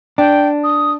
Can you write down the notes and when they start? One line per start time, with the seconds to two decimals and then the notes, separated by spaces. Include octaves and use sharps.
0.18 D4 G5
0.64 D#6